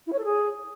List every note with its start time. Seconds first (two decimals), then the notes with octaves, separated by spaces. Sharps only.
0.06 E4
0.12 C#5
0.18 A4
0.24 G#4